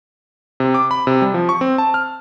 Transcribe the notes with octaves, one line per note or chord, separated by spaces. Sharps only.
C3
D6
B5
C3
G3
F3
C#6
C4
A5
F6